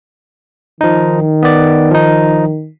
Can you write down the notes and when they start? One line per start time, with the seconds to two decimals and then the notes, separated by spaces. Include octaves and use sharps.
0.81 D#3 F3 D#4
1.43 B3 D5
1.91 F3 D#4